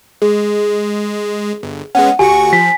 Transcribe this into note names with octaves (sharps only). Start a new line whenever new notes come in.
G#3 G#4
G1
G#3 B3 C#4 F#5
D2 F#4 G4 G#5 C#6
F3 B6